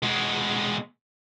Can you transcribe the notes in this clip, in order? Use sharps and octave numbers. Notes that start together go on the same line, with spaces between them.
B2 G#3